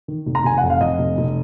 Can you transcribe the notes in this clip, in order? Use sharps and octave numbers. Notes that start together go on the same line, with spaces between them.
D#3
F1
A#5
F1 G#5
F#5
F2
F5
F2 D#5
F1
F1